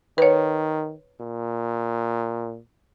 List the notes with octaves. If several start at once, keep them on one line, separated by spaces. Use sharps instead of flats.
D#3 B4 C#5
A#2